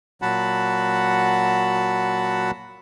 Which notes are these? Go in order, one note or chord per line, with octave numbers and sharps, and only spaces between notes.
A#2 F#3 F#4 F#5 A5 B5